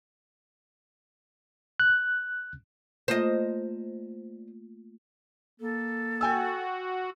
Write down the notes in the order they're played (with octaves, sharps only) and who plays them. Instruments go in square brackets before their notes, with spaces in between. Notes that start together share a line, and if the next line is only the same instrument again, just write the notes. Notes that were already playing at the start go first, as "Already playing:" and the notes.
[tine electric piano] F#6
[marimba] A3 A#3 F4 [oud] C5 D#5
[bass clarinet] A#3 [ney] A4
[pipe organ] F#4 [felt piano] G5 G#5 E6